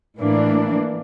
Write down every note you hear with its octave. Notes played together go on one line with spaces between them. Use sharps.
A2 E3 A#3 D4